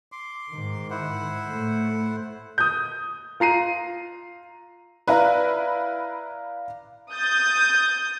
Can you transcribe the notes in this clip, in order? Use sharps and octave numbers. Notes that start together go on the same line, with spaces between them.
C6 D6
G#2 D#3
E4 C5 F#5
A2 A3
D#6 G6
F4 A#5 C7 D#7
E4 B4 D5 F5 A#5
D#6 G6 A6